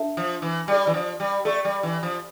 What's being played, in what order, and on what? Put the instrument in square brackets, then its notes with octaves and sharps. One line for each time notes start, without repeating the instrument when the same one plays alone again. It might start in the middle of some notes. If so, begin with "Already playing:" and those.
Already playing: [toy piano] D4 A4 E5 A5
[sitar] F3
E3
[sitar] G3 [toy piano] G4 D5 G5 C#6
[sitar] E3
F3
G3
[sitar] A3 [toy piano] A4 D5 G5 C#6
[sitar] G3
E3
F3